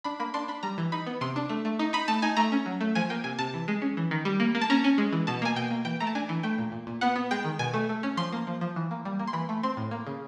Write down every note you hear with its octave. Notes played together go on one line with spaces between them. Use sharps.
D4 B5
A#3 B5
D4 C6
D4 B5
G3 A#5
E3
D#4 B5
B3
C3 C6
D4
A3
A3
D#4
D#4 B5
A3 A5
D#4 G#5
A3 A#5
C#4
F#3
A3
F3 G#5
A#3 G5
C3 G#5
C3 A5
E3
G#3
C#4
E3
D#3
G3
A#3
A#3
A5
C#4 A#5
C#4
G#3
E3
B2 A5
A#3 G#5
B2 G5
A#3
E3 G5
A3 A#5
A5
D4 G#5
E3
A3 G5
A#2
A#2
A#2
B3 F#5
B3
G#3 G5
D#3
B2 G#5
A3
A3
C#4
F3 C6
A#3
F3
F3
E3
A#3
G3
A#3
C6
E3 B5
A3
C4 C6
A2
A#3
C#3